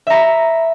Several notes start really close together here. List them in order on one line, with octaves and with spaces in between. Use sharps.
E5 A#5 B5